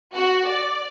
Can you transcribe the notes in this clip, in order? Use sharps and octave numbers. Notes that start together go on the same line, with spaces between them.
F#4
D5